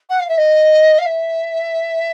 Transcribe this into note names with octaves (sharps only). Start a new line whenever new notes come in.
F#5
F5
E5
D#5
F5
E5